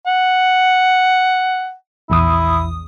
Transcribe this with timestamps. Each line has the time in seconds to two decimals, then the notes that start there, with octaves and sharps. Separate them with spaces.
0.07 F#5
2.10 A#1 E2 E4 D#6